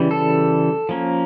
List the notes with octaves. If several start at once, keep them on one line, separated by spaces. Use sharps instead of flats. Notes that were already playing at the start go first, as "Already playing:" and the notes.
Already playing: C#3 E3 G3
A4
F3 A#3 C#4